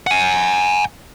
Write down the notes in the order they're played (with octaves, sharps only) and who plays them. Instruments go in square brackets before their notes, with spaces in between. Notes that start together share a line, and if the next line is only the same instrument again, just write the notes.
[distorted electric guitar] F#5 G#5